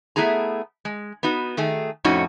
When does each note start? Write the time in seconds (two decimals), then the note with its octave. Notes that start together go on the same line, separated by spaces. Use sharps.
0.16 A3 B3 E4 G#4 A#5
0.85 G#3
1.23 B3 D#4 F#4
1.57 D#3 A3 G#4
2.04 F2 A2 A3 C#4 D#4 F#4